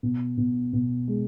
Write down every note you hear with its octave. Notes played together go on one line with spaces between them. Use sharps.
B2
B2
B2
G#3